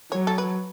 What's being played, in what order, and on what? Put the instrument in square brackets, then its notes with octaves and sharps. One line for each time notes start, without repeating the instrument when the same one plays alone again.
[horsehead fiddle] F#3 [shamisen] C#5
[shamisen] A4
B4